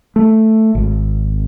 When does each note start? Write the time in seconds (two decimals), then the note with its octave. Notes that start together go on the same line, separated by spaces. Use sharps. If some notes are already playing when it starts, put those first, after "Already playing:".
0.16 A3
0.75 G#1